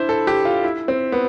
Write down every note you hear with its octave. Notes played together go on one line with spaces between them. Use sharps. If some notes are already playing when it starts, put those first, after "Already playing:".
Already playing: D4 E4 C5
A4
G4
F4
E4
C4
B3